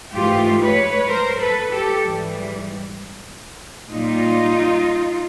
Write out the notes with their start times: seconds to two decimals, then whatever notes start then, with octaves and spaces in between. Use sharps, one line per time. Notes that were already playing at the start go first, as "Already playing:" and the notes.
0.13 G#2 E3 A3 F4 G4
0.62 B4 C#5
1.08 A#4 C5
1.39 A4 B4
1.71 G4 A4
2.03 G#2 E3 G3
3.91 A#2 G3 D#4 F4